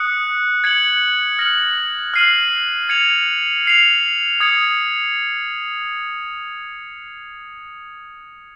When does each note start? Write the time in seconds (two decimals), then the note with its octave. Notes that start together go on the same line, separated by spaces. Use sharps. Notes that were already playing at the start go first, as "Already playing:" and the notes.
Already playing: D#6 F#6 C#7
0.64 G#6 C#7 F#7
1.39 F6 A#6 C#7 F#7
2.14 F6 C7 D#7 F#7
2.89 G#6 C#7 F7
3.65 F6 C7 F7
4.40 D#6 G#6 C#7